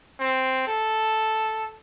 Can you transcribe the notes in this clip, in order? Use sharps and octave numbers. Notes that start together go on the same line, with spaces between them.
C4
A4